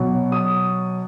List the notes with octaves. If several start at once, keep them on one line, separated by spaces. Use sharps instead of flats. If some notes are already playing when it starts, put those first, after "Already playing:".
Already playing: B2 F#3
D#6